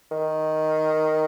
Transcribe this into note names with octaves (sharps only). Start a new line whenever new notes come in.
D#3